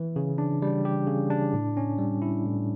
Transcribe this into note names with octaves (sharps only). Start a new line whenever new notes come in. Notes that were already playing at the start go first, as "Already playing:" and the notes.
Already playing: E3
C#3
D4
G3
G4
C#3
D4
A2
C#4
G3
E4
A2